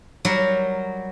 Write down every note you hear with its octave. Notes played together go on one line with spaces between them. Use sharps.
F#3 G3 F#4 A#4